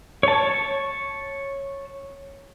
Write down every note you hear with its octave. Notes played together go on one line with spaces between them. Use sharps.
C#5 A5